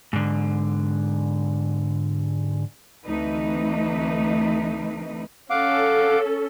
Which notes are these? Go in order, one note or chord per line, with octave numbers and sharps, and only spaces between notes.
G#2 D3
D2 E3 A3 C4 D#4 B4
C#4 A4 F5 F#5 D6